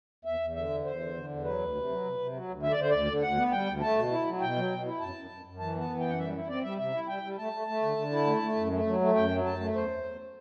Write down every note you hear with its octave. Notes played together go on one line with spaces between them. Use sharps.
E2 E5
E2
D3 E5
E2
E2 C5
D3
D3
E2
F#3 B4
D2
C3
F#3
C3
C3
F#3
D2
D3 E5
D5
D3 C5
D2 D5
D3
D2 F#5
B3
G3 G5
D2
A3 A5
B2
E4
F#3
B2 G5
F#3
B2
E4
F#2 A5
F#2
F#2
F#2
E3 A5
B3 A5
E3
F#2 G5
F#5
G3 E5
E4
C4 D5
G3 E5
C3 E5
E4
G3 G5
G3
A3 A5
A3
A3
D3
D3
E4
A3
A3
F#2
A3
F#3
A3
F#2 G5
F#3
F#2 A5
A3
E2 C5
E2
E2